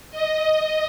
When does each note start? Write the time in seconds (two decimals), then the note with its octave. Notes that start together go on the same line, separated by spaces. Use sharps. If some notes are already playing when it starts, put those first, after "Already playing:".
0.11 D#5